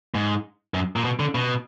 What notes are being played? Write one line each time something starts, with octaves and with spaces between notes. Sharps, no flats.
G#2
F#2
A#2
B2
D3
B2